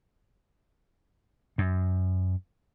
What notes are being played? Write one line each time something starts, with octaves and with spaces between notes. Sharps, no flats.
F#2